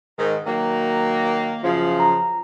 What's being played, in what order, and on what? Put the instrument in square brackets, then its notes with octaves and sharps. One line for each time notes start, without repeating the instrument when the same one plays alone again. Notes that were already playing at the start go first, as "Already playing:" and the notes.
[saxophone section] G#2 D#3
D#3 F#3 A#3
F#2 C#3 F3
[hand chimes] A#5